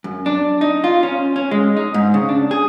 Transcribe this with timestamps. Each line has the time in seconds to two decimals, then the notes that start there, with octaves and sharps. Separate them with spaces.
0.04 F#2
0.26 D4
0.61 D#4
0.84 F4
1.03 C#4
1.36 C#4
1.51 G#3
1.77 D#4
1.94 G#2
2.14 C#3
2.29 D4
2.51 G#4